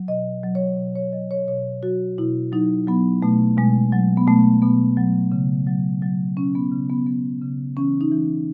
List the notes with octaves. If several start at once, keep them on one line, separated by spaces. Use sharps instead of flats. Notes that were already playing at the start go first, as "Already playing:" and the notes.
Already playing: F#3
B2 D#5
F#3
C#5
B2
C#5
F#3 D#5
C#5
B2 C#5
F#3 F#4
B2 E4
F#3 D#4
F#3 B3
B2 A3
B2 G#3
F#3
B3
B2 A3
B2 B3
F#3
C#3
F#3
F#3
C#3 C#4
B3
C#3
B3
F#3 B3
C#3
E3 C#4
D#4
E3